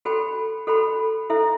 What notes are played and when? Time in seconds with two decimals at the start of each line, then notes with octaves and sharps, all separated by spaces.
0.05 F#4 A4 C5 G5 B5
0.67 F#4 A4 C5 G5 B5
1.30 E4 A4 C5 E5